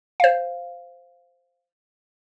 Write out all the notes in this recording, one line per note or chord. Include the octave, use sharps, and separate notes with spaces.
C5 F5